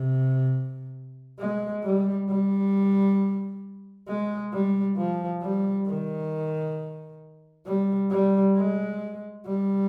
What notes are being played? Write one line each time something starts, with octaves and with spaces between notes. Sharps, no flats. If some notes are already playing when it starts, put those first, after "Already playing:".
Already playing: C3
G#3
G3
G3
G#3
G3
F3
G3
D#3
G3
G3
G#3
G3